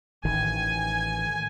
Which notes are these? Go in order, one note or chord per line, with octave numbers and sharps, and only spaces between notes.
A1 D#3 G#5